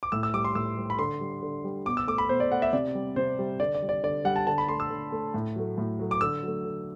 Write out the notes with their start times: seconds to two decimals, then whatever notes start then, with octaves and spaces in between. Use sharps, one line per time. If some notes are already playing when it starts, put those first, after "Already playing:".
0.03 D6
0.12 A2 E6
0.23 E6
0.34 G3 D6
0.45 C6
0.55 A2 E6
0.78 G3
0.90 B5
0.99 D3 C6
1.21 G3
1.42 D3
1.64 G3
1.86 B2 D6
1.97 E6
2.08 A3 D6
2.18 B5
2.29 B2 C5
2.40 D5
2.51 A3 F#5
2.62 E5
2.73 C3 D5
2.95 G3
3.16 C3 C5
3.39 G3
3.60 D3 D5
3.75 D5
3.82 G3
3.89 D5
4.03 D3 D5
4.25 G3 F#5
4.36 A5
4.47 D3 A5
4.58 B5
4.68 A3 C6
4.80 E6
4.90 D3
5.12 A3
5.34 A2
5.56 F#3 A3
5.78 A2
5.99 F#3 A3
6.11 D6
6.21 D3 E6
6.43 F#3 A3
6.65 D3